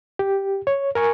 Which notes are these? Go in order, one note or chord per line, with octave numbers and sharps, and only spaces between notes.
G4
C#5
A#4 G#5 C#6